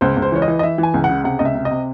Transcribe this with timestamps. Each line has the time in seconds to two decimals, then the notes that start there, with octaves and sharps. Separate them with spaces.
0.01 C#2 C5
0.17 C#2
0.22 C5
0.32 E3 C#5
0.42 D#5
0.48 E3
0.59 D#5
0.63 E3 E5
0.78 E3
0.83 G#5
0.94 C#2
1.04 F#5
1.09 C#3
1.24 C3 F#5
1.39 C#2 D#5
1.45 E5
1.55 C3
1.65 D#5
1.71 C3